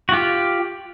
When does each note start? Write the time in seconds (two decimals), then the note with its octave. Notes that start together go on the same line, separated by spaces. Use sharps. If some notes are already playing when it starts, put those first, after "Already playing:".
0.09 F#4
0.12 F4 G4